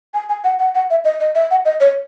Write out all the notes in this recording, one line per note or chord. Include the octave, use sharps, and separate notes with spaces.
G#5
G#5
F#5
F#5
F#5
E5
D#5
D#5
E5
F#5
D#5
C#5